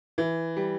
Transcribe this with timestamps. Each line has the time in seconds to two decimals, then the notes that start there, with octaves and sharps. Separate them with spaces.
0.18 E3
0.57 G3